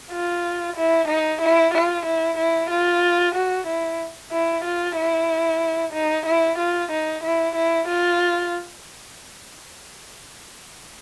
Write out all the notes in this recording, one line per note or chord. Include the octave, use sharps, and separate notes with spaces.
F4
E4
D#4
E4
F4
E4
E4
F4
F#4
E4
E4
F4
E4
D#4
E4
F4
D#4
E4
E4
F4